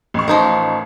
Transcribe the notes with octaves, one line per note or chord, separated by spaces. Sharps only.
A1 C#6
F3 D#4 A#4